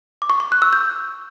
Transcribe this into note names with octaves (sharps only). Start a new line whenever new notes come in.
D6
C#6
C#6
F#6
E6
G6